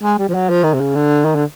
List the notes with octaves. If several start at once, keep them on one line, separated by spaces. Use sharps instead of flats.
G#3
G3
F3
F#3
F3
D#3
C3
C#3
D3
D#3
D3